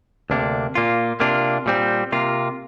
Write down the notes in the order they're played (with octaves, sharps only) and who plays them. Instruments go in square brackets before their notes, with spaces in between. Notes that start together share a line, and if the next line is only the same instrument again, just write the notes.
[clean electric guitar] D2 C3 A#3 D4
A#2 A#3 F4
C3 A#3 D4 F4
A#2 G3 C4
C3 A#3 F4